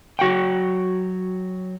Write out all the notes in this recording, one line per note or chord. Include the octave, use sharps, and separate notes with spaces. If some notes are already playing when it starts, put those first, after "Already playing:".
F#3 F#4 F#5 G5